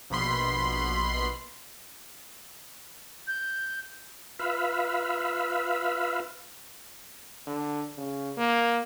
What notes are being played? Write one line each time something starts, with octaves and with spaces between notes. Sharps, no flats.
A#1 B2 B5 C6
G6
F4 B4 E5 F5 B5
D3
C#3
A#3